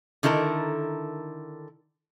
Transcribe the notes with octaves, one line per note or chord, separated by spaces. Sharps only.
D3 D#3 E4 A4 A#4